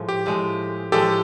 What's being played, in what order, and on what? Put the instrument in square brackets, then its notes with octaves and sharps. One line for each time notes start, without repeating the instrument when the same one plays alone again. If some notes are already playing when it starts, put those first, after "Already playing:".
Already playing: [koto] A2 F3 G#3
[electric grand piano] G4
[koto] A2 F3 G#3
[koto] A2 F3 G#3 [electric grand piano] G4 A4